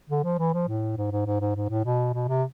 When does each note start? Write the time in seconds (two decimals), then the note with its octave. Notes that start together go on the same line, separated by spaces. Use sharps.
0.10 D3
0.24 F3
0.39 E3
0.53 F3
0.68 A2
0.97 G#2
1.12 G#2
1.26 G#2
1.41 G#2
1.55 G#2
1.70 A2
1.85 B2
2.14 B2
2.28 C3